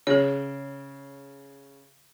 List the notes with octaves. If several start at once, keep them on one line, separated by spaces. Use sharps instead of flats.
C#3 G#4 C#5